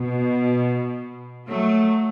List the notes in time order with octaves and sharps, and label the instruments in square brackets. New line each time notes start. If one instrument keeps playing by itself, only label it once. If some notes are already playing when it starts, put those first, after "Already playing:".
Already playing: [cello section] B2
F#3 A3